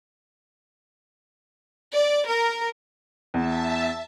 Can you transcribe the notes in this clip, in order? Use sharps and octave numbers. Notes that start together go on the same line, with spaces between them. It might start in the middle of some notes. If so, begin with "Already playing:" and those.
D5
A#4
E2 E5 A5